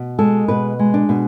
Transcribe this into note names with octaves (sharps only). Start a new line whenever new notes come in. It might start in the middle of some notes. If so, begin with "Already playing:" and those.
Already playing: B2
G#3 A4
B2 B4
G#3
D4
B2